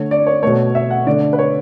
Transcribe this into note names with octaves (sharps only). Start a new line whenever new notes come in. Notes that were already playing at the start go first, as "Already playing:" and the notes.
Already playing: D3 A3 C#5
D5
C#5
B2 A3 C#5
E5
F#5
D3 A3 D5
B4
C#5